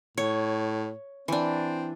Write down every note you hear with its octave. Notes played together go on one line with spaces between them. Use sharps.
A2 C#5
E3 C4 D4